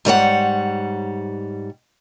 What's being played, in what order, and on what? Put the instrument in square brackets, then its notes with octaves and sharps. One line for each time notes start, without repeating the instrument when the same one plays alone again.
[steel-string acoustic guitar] G#2 G3 C#5 F#5